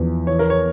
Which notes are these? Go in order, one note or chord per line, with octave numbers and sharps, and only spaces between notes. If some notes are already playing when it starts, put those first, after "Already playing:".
Already playing: E2 F3
E3 C#5
A#4
C#5